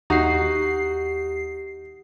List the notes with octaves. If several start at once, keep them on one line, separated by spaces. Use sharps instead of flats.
D#2 D#4 F#4 G4 C7